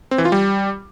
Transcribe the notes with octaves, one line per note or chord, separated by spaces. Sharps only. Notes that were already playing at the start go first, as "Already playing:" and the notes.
C4
E3
F4
G3